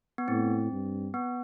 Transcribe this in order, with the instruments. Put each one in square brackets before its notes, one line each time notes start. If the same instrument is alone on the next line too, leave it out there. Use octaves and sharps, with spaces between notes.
[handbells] B3
[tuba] A2 [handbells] C4
[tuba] G2
[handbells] B3